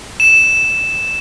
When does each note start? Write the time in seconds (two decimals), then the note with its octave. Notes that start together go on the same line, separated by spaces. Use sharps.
0.20 E7